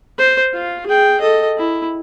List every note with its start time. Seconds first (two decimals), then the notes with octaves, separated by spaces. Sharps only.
0.18 C5
0.53 F4
0.86 G#4 G5
1.21 A4 D#5
1.57 E4